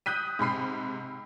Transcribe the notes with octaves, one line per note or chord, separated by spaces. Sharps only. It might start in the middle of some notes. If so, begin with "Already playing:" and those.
D#6 F#6 G6 B6 D#7
G#2 C3 B5 C7